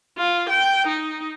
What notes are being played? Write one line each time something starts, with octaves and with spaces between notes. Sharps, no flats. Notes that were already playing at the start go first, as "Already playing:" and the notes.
F4
G5
D#4